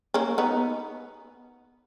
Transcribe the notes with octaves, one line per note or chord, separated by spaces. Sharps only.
A#3 C#4
B3 D#4